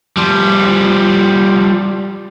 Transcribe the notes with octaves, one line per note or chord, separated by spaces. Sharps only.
F3 G3